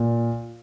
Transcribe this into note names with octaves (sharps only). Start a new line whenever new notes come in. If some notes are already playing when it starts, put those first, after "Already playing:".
Already playing: A#2